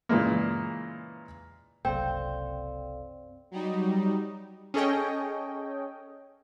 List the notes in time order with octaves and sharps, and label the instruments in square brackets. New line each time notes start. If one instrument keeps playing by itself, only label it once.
[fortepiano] A#2 C#3 E3 G#3 A#3
[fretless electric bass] F#1 C2 [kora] C4 [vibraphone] A4 D5 F5 [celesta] G5
[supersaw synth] F#3 G3 D#4
[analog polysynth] C#4 G#4 A4 C#5 D#5 G5